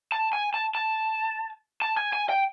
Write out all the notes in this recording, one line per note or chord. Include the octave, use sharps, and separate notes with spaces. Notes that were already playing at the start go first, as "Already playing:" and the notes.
A5
G#5
A5
A5
A5
G#5
G#5
G5